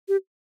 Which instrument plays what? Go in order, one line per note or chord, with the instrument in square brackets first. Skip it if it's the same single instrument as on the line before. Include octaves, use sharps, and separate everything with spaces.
[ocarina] G4